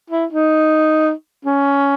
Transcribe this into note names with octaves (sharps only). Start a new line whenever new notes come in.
E4
D#4
C#4